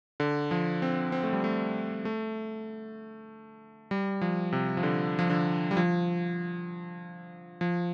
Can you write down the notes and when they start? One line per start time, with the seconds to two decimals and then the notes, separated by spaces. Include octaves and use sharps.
0.20 D3
0.51 F3
0.82 C4
1.12 C4
1.23 A3
1.33 G3
1.44 A3
2.05 A3
3.91 G3
4.21 F3
4.53 C3
4.77 F3
4.83 D3
5.19 F3
5.30 D3
5.71 G3
5.77 F3
7.61 F3